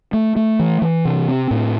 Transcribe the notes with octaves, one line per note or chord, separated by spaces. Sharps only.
A3
A3
E3
E3
C3
C4
A2